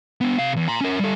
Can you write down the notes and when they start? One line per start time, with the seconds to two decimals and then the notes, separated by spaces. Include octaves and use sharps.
0.21 B3 D4
0.39 C3 F5
0.56 E2
0.68 A#5 C6
0.81 C#4 A#4
0.99 G3 A4